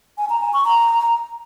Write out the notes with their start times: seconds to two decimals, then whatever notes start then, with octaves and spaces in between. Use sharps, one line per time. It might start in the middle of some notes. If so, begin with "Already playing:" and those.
0.18 G#5
0.30 A#5
0.42 G#5
0.53 C#6
0.65 A#5